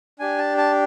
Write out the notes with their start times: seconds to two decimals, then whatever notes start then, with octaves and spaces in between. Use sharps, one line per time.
0.19 D4 G4 G#5
0.38 A5
0.57 A5